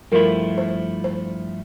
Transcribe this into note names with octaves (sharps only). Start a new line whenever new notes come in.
G2 F3 A3 E4 A#4
C5
C5